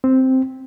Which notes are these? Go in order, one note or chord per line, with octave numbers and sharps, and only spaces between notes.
C4